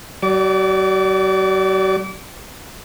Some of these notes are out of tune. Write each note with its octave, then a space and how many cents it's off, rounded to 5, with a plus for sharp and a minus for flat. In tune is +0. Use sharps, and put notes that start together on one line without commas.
F#3 +45 D5 +10 D6 -35